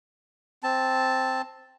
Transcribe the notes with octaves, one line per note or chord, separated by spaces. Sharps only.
C4 A5